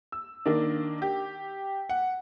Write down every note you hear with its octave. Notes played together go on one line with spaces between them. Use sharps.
E6
D#3 A#3 D4
G4
F#5